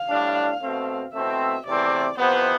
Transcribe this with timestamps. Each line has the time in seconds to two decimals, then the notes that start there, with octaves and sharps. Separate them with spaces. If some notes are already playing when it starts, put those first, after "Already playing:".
Already playing: F5
0.09 A2 G3 D4
0.62 B2 A3 C4
1.13 B2 A3 C4 E4 E5
1.66 E2 C3 E3 A3 C4 D5
2.17 F2 C3 E3 B3 C5